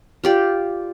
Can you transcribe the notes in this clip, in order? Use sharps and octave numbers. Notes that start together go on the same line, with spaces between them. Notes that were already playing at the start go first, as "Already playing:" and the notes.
F4 G4 D5